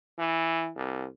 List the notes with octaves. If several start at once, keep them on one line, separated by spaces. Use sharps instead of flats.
E3
C2